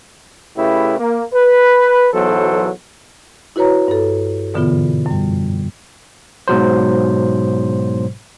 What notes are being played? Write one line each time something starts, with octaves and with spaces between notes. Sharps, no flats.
C#3 A3 E4 G4 B4
A#3
B4
B1 E2 F#3 A4 C5
E4 F#4 B4 C#5 A#5
G2 A4
G#2 B2 D3 E3 B3 F4
F#2 G3
G#2 B2 F#3 C5